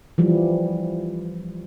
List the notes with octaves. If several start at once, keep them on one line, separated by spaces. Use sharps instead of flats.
E3 F3 G3